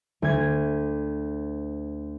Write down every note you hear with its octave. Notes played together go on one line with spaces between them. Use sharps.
D2 G#6